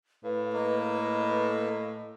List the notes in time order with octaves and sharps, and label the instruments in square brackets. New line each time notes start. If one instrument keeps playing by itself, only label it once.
[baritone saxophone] A2 [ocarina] B4 [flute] F5
[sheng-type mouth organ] A#3 [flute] D#5